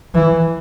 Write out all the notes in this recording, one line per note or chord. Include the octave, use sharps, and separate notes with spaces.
E3